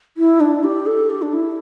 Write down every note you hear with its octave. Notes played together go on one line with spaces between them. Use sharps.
E4
D4
G4
A4
G4
D4
E4